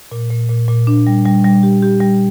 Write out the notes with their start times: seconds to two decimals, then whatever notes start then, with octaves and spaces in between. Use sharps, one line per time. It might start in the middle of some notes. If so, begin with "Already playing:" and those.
0.11 A#2
0.31 A#2
0.49 A#2
0.68 A#2
0.87 D4
1.07 G3
1.25 G3
1.44 G3
1.63 G4
1.82 G4
2.01 G3